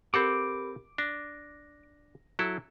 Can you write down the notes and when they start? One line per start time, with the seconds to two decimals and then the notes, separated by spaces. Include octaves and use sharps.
0.14 C4 G4 A4 A#4 F#5 B5 D6
0.98 D4 A#6
2.39 F#3 E4 A4